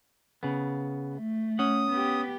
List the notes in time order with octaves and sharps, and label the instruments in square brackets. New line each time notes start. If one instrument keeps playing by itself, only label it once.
[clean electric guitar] C#3 B3
[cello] A3
[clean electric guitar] C#4 F#5 [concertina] D#6
[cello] B3 G4